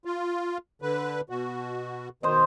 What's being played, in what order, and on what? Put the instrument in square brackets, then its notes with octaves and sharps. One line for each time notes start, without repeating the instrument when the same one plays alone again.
[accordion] F4
D3 B4
B2 F#4
[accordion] B2 D#3 [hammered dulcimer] C5 D#5